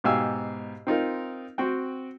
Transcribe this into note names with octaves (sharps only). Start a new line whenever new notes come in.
G#2 B2 G4 F5 G#5 E6
C4 D#4 F4 A#4
C4 F#4 G5